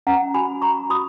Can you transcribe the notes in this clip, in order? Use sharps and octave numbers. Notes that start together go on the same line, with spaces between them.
C#4 F#5 A#5
F#4 G#5 B5
F#4 A#5 C#6
F#4 B5 D#6